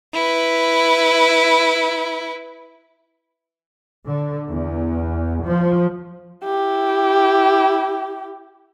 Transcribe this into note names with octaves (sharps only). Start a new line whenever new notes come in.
E4 B4
D3
E2
F3
E4 G4